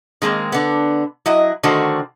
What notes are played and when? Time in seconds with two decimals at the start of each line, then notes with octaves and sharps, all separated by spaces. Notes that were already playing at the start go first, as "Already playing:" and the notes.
0.22 D#3 G#3 A#3 C4
0.52 D3 B3
1.26 F#3 E4 D#5
1.63 D3 D#3 A3 F#4 C5